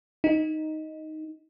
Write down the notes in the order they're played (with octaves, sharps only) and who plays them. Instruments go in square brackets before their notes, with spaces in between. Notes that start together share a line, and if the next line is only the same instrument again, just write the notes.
[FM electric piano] D#4